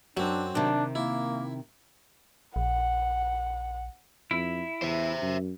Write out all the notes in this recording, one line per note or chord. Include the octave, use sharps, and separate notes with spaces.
F#2 F#3 C4 D4
C3 D#3 D4
A#3 E4
A#1 F#5
F2 E4
E2 C5 E5
F#2